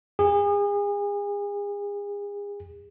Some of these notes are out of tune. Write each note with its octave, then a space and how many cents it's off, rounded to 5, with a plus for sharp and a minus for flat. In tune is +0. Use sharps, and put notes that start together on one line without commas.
G#4 -35